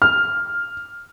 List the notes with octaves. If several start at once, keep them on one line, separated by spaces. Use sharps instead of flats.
F6